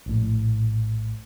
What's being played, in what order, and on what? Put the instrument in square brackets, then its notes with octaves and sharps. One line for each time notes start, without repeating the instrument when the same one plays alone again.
[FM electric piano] A#1 A2